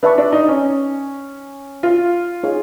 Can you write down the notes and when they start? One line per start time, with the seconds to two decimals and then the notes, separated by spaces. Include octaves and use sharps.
0.03 D4 B4 E5 A5 C#6
0.18 D4
0.32 D#4
0.48 C#4
1.83 F4
2.43 D#4 G#4 C#5 F5